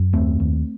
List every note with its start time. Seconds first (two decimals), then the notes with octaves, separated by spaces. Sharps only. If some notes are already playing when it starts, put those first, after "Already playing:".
Already playing: F#2
0.13 D#2 A3 C4
0.40 D#2